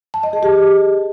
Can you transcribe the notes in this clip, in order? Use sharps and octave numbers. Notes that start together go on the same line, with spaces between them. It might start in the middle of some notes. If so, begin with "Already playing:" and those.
A5
D#5
G#4
G4